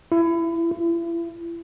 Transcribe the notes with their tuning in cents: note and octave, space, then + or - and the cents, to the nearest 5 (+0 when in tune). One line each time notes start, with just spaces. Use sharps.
E4 +25
E4 +40